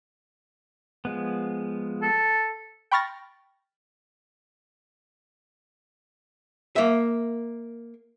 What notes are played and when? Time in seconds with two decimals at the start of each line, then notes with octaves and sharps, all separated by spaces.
1.05 F3 G#3 B3
2.02 A4
2.91 G5 B5 C#6 F6 A6 A#6
6.76 A#3 E5